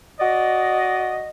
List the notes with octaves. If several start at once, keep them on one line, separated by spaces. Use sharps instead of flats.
F#4 D5 D#5